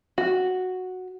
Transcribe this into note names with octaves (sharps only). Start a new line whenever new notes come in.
F#4